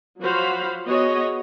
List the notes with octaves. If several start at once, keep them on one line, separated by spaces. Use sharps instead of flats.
F3 F#3 F#4 C5 F5 B5
B3 F#4 G#4 C#5 D#5